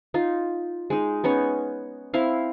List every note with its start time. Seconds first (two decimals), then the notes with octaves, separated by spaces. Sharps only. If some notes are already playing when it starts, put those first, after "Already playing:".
0.14 D#4 F4
0.90 G#3 D#4
1.24 B3 C#4 D#4 C#5
2.14 C4 E4 F5